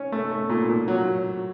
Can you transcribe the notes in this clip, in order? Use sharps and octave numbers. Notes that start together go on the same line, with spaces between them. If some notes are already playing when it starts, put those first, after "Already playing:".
Already playing: C#4
A3
A3
A#2
A#2
F#3